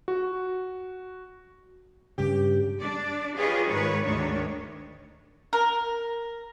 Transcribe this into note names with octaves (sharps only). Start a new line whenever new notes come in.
F#4
G2 C#3 G4
D4 D5
F4 G4 G#4 B4 C#5 D#5
G#2 D#3 B4 C#5
D2 G#2 D#3 D4 C#5
A#4